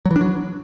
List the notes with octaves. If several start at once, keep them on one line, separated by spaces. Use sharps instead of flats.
F#3
E3
D4
F#3